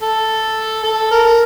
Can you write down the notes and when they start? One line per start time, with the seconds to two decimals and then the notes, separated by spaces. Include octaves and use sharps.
0.01 A4
0.84 A4
1.11 A#4